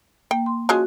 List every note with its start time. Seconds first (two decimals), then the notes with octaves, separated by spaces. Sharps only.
0.31 A#3 G5
0.46 C6
0.69 F3 G#3 C#4 F#4